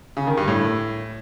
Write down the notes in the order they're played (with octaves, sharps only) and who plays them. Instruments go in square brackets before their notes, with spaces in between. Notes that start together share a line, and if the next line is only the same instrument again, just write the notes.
[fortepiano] C#3
D#3
G2
A2